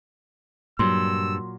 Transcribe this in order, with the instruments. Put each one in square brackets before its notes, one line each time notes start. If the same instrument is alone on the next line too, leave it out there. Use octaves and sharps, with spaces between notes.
[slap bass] G2 [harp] A#2 F#3 [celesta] C6 [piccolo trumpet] E6